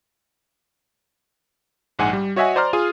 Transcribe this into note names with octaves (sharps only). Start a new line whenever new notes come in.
A#1 G#2 F#5 G#5
G3
F#4 C#5 D#5 E5 F#5 G#5
C5 D5 A#5 C6 F6
F4 G#4 G#5 D#6